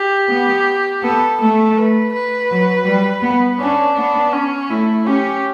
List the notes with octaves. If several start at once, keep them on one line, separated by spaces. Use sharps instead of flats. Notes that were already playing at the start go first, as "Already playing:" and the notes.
Already playing: G4
B3
B3 A4
A3 A4
B4
B4
F#3
G3
B3
C#4 D4
B3
C#4
A3 E4
C#4 G4